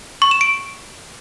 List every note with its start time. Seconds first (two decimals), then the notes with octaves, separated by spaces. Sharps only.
0.22 C#6
0.31 E7
0.41 D7